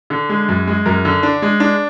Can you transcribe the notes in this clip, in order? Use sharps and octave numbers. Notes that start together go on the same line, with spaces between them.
D3
G#3
F#2
G#3
F#2 A#4
D3
D4
G#3
D4